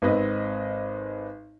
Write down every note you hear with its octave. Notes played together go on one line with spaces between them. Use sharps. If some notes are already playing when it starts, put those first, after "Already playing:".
G#1 C4 B4 D#5